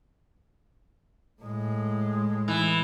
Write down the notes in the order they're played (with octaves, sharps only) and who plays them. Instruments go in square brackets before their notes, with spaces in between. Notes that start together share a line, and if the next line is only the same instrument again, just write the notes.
[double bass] A2 G#3
[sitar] E3